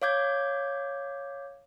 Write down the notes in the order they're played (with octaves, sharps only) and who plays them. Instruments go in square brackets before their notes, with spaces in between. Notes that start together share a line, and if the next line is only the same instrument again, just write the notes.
[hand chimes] C#5 F5 D6 G6 G#6